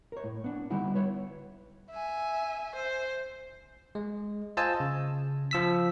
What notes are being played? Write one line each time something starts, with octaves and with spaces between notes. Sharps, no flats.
A#4 C#5
A2
B3 D4
D3 G3 B3 D#4 E4 F#4
B4 C#5 E5
E5 G#5
C5
G#3
F4 C5 D#5 G#5 A5 E6
C#3
F3 E6 B6